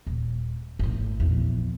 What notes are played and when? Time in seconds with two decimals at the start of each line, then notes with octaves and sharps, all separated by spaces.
0.07 D#1
0.79 G#1 A2
1.20 A#1 E2